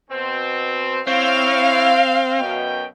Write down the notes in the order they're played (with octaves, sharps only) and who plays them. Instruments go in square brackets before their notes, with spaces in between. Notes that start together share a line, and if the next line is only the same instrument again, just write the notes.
[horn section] B2 C4
[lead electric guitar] C4 [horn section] E4 C#5 [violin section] F5
[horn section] F#2 B2 G5